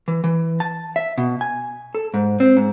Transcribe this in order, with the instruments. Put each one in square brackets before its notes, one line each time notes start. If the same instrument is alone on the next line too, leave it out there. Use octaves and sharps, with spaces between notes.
[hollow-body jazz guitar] E3
E3
A5
E5
B2
G#5
A4
G#2
C4
G#2